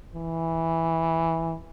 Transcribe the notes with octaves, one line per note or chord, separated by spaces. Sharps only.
E3